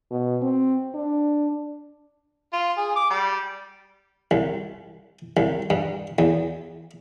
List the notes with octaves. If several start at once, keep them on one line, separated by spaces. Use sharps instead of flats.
B2
C4
D4
F4
G#4
D6
G3
C2
C2
G2
E2